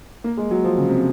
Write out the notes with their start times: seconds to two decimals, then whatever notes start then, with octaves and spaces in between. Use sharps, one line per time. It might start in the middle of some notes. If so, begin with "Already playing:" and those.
0.24 A#3
0.37 G#3
0.51 F#3
0.64 F3
0.78 C#3
0.89 C3